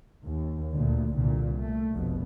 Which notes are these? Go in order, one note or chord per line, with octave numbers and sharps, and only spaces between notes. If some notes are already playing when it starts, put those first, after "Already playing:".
D#2
D2 A#2 D3
C2 A#2 D3
A3
F1 A#1 B2